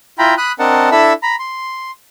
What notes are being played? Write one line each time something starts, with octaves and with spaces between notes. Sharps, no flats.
E4 F4 G5 A#5 B5
B5 D#6 F#6
C4 D4 A#4 D#5 F#5 A5
D4 E4 A4 E5 B5 E6
A#5 B5
C6